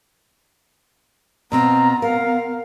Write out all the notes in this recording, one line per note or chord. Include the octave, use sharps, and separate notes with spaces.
B2 B3 C4 F4 A#5
A#4 F5